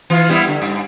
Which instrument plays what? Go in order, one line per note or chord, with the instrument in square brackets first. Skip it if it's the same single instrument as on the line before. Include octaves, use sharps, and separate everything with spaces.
[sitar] E3 F4
G3 B3 E4
D3
G2